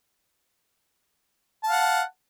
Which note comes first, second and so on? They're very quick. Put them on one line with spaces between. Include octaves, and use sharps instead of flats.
A5 F5 F#5